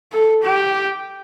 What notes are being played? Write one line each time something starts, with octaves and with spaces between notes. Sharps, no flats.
A4
G4